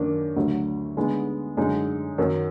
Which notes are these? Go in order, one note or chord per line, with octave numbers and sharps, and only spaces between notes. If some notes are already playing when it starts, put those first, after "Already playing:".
Already playing: F#2 D#3 A#3 D4
D2 D3 F#3
D3 G#3 B3 D#4
F#2 D3 G#3 D#4
F#2 D#3 F#3